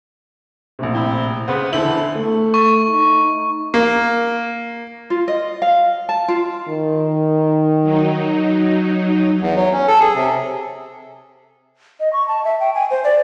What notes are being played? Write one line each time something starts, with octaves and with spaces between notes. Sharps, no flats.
A#1 A2 C3
C4 E4
C#3 B3 C5
E2 D3 E4 A4 C5 F#7
A3
C#6
D#4
A#3
F4
D#5
F5
A5
F4
D#3
F#3 D#4
E2
F#3
C#4
A4
G#4
C3
D#5
C#6
A5
E5
G5
G#5
C5
D5